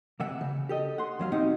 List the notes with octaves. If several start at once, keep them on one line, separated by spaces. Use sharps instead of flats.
C3 E3 E5 F#5
C#3
G4 A4 D#5
F#5 C6
E2 F#3 F5
B2 C4 D#4 G4 F#5